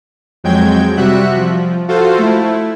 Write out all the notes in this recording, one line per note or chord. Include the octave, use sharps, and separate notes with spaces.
F2 F#3 G#3 G5 G6 G#6
C3 G3 F#4 E5 F#6
F3
F4 F#4 A4 C5 F5
A3 E4